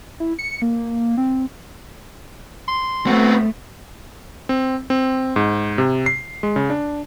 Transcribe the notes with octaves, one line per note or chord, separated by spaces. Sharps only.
E4
C#7
A#3
C4
C6
A3 B3 C4 F#4
C4
C4
G#2
C3
C7
G#3
C#3
D4